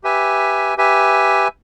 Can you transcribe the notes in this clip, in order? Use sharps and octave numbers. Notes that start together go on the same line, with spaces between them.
G4 B4 E5 G#5
G4 B4 E5 G#5